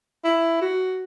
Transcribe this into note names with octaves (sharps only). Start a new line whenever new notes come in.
E4
F#4